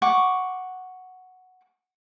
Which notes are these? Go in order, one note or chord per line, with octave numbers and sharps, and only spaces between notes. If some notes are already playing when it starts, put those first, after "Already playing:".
F#5 C#6 D6